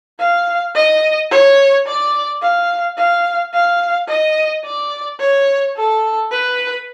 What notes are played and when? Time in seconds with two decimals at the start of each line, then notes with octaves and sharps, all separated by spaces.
0.20 F5
0.75 D#5
1.31 C#5
1.86 D5
2.42 F5
2.98 F5
3.54 F5
4.08 D#5
4.65 D5
5.20 C#5
5.77 A4
6.31 B4